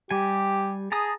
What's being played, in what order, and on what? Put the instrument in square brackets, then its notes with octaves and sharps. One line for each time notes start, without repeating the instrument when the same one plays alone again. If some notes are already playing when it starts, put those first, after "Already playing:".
[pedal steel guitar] G3 G#5 [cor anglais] G4
[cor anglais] G#4 [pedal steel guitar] A5 A#5 D#6